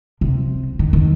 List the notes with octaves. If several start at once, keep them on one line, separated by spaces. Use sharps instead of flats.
C3
D#3
D#3